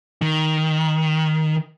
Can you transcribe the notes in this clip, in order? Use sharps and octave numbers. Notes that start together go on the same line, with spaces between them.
D#3